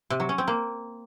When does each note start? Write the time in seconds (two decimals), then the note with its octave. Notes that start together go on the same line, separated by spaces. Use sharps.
0.10 C3
0.20 F#3
0.29 C#4
0.38 C4
0.48 A#3